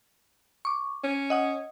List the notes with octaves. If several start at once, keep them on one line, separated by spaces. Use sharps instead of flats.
C#6 D6
C#4
D#5 F#5 D#6